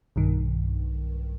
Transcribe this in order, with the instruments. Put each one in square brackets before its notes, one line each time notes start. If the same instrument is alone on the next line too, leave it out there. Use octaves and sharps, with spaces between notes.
[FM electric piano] B1 G2 D#3